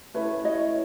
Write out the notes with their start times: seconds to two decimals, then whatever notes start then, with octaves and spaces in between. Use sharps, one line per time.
0.14 A3 C#4 E4 B4 C#5
0.44 C#5 D#5